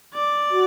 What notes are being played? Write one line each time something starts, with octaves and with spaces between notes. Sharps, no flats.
D5
F#4